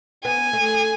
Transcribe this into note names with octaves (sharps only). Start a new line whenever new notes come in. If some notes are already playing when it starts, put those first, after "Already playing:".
B3 G#5
A3